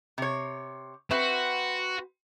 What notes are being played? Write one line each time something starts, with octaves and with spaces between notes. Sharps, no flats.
C3 C#5
C4 F#4 B4 E5